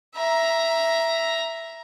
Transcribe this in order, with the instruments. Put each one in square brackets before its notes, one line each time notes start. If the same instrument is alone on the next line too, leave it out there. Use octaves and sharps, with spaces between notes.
[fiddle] E5 A#5